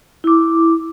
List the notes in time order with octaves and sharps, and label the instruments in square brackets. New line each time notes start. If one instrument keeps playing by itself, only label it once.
[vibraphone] E4 D6